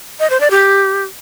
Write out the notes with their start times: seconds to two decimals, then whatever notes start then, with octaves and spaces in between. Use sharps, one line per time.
0.20 D#5
0.30 C5
0.40 D5
0.51 G4